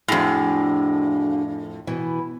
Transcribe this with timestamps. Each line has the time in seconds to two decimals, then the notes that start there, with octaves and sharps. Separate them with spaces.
0.08 F2 A2 D4 F#4 G#4
1.87 B2 E3